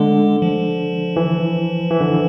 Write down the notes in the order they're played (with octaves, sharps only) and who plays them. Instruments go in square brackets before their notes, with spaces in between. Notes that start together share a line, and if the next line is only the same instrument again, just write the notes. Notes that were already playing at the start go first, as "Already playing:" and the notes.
Already playing: [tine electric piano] D3 [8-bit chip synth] G#3
[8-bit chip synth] F3
[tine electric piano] E3
E3
D3